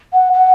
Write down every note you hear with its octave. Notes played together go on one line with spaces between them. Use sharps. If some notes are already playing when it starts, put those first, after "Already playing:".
F#5
F#5